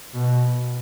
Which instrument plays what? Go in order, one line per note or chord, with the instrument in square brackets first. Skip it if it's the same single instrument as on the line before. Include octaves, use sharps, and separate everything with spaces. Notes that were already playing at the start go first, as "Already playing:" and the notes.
[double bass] B2